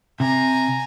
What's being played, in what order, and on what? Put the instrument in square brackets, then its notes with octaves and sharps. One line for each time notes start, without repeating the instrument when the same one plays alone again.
[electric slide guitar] C3 [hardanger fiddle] G#5 A#5